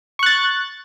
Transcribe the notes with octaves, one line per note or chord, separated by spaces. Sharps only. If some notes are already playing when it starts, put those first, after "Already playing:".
C#6 F#6 A6